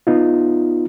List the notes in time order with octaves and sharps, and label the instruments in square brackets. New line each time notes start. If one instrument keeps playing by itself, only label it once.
[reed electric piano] B3 D#4 F4